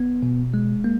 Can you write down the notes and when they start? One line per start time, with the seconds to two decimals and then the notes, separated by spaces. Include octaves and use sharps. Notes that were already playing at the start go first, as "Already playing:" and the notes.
Already playing: B3
0.23 B2
0.54 G#3
0.84 A#3